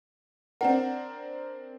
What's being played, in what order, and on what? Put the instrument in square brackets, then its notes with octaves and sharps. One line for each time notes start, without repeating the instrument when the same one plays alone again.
[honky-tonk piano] C4 D4 A#4 [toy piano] F#5